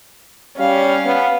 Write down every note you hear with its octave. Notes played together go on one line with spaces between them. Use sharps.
G3 C#4 F5
B3